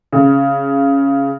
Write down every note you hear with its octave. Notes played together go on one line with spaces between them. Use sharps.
C#3